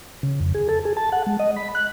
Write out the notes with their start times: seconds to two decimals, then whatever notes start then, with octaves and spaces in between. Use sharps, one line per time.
0.23 C#3
0.41 F2
0.55 G#4
0.69 A4
0.85 G#4
0.97 A5
1.12 F#5
1.27 G#3
1.39 D#5
1.56 B5
1.75 F#6